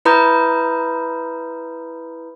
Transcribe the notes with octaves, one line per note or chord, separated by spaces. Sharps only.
E4 B4 A#5 B5 D#6 G6